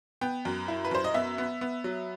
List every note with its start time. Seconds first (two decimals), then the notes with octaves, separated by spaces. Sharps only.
0.21 B3 G5
0.45 F#2
0.68 E4
0.85 B4
0.91 F#2 C5
1.04 D#5
1.14 B3 E5
1.38 B3
1.61 B3
1.84 F#3